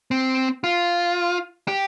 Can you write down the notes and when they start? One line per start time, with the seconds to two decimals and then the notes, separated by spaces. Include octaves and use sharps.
0.11 C4
0.64 F4
1.68 G4